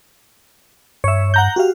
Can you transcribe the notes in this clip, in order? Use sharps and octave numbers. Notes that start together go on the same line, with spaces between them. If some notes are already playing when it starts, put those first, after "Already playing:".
G2 C#5 E5
F#5 A#5 G6
F#4 G4 F5